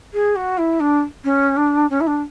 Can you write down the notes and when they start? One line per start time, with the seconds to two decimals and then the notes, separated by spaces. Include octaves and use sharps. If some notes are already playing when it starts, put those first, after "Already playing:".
0.13 G#4
0.35 F#4
0.58 E4
0.80 D4
1.24 C#4
1.56 D4
1.90 C#4
2.00 E4
2.07 D4